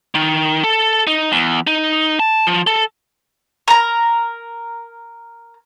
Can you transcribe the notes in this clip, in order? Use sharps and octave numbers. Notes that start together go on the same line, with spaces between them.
D#3
A4
D#4
E2
D#4
A5
F3
A4
A#4 A#5